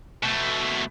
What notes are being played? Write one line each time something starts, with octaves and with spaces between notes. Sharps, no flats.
B2 A3